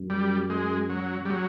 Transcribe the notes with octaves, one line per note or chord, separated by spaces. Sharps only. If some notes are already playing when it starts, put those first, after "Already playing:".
Already playing: F#2
G3
G#3
F#3
G3
F#3